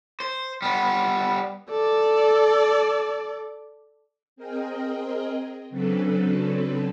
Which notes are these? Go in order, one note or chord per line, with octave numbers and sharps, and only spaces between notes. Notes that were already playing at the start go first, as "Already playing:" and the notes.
C5
G3 B3
A4 D5
C4 G#4 A#4 D#5 G5
C#3 F#3 C4 D4 A4 B4